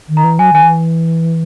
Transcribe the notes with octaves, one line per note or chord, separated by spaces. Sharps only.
D#3
A#5
E3
F#3 G#5
D#3 G#5
E3